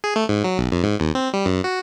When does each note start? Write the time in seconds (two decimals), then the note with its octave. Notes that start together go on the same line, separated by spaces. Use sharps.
0.04 G#4
0.16 A3
0.29 G#2
0.44 F#3
0.58 B1
0.72 F2
0.84 G#2
1.00 D#2
1.15 C4
1.34 G3
1.46 F#2
1.64 F#4